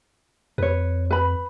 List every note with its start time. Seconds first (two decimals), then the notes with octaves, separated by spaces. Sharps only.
0.58 F2 B4 C#5
1.11 B4 B5